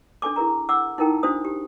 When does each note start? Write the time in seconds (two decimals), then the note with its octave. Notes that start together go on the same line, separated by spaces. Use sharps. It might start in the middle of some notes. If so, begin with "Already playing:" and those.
0.22 D4 A4 G#5 D6
0.36 E4 G#4 A#4 A#5
0.69 F#5 D6 E6
0.98 D#4 E4 A4 A#4 G5 A5
1.23 D4 F#4 C5 D#6
1.45 G4